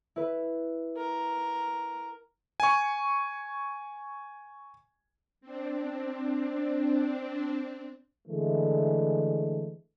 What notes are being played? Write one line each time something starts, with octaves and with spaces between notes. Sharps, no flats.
E4 B4
A#4
G#5 C#6
C4 D4
D3 E3 G#3 A3